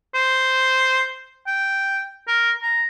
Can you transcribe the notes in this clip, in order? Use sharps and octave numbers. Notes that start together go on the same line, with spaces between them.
C5
G5
A#4
A#5